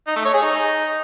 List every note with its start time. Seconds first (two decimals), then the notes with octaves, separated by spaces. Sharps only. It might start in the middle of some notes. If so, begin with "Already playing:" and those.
0.07 D#4
0.16 A3
0.25 C#5
0.34 G#4
0.42 D#4